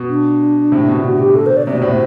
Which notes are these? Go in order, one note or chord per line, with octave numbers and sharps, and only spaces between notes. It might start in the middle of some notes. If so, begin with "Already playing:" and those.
Already playing: B2
D4
A2 C3
B2 D3
F#4
G4
A4
C5
D5
C3 D5
B2
A2 C5
B2